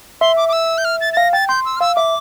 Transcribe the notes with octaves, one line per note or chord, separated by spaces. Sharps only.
E5 C6
D6
D6
E6
G6
F6
A6
A6
F5 A#6
G5 A6
C6 G6
E6
F6
F5 E6
E5 D6